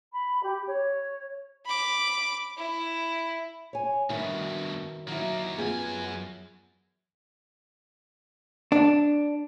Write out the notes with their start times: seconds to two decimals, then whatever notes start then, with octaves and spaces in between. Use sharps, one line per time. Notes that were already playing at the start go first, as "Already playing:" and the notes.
0.12 B5
0.42 G4
0.67 C#5
1.66 B5 D6
2.58 E4
3.73 C#5 G#5
4.10 G2 B2 D#3 E4 F#4
5.08 D#3 F#3 A#3 E4
5.58 F#2 B3 F4 G#4 G#5
8.72 D4